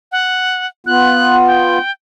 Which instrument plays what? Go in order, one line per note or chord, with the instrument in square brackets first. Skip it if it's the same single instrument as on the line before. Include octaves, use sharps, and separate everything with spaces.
[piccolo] F#5
[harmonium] B3 F4 [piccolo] F#6
[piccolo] G5